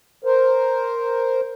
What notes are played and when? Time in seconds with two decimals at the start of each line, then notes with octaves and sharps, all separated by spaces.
0.24 A#4 C5